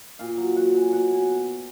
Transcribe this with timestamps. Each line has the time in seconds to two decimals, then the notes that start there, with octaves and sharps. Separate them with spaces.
0.19 A#2 F5
0.38 F#3
0.56 F#3 F#5
0.74 F#3 G#5
0.92 B2 F#5
1.11 B2 G#5